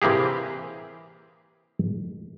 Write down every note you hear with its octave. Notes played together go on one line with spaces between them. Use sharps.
C3 E3 A#3 G4 G#4